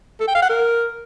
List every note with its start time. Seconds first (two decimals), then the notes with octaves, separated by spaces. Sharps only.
0.20 A4
0.28 G5
0.35 F5
0.42 F#5
0.49 A#4